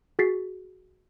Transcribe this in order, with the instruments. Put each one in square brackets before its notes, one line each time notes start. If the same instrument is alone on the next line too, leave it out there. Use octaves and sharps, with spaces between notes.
[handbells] F#4 G#4 A6 B6 C7